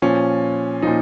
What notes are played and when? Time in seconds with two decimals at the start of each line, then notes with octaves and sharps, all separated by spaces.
0.02 A#2 F3 C#4
0.82 A#2 F3 D#4